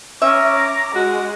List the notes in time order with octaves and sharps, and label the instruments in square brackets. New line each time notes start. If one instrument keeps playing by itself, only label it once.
[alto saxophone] C#4 [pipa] E5 [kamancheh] A#5 D6
[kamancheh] G#3 [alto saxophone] F#4